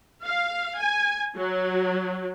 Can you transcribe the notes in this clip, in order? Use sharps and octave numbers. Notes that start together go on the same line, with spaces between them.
F5
G#5
F#3